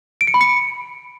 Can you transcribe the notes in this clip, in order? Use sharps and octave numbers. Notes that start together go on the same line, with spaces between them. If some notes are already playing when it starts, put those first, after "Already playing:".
D7
C#7
B5
C#7